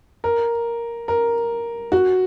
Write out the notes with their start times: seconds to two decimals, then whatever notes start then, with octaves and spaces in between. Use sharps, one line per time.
0.24 A#4
1.08 A#4
1.92 F#4